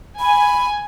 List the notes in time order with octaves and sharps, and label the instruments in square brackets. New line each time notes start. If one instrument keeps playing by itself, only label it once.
[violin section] G#5 [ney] B5